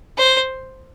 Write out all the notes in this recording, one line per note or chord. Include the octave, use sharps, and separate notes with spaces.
C5